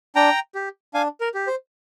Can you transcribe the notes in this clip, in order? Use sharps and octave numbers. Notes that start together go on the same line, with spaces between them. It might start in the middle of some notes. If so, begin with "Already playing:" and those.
D4 G5 A#5
G4
D4 F5 G#5
A#4
G4
C5